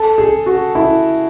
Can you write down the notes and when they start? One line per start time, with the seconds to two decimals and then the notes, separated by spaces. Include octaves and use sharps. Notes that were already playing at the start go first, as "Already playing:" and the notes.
Already playing: A4
0.18 G#4
0.46 F#4
0.75 E4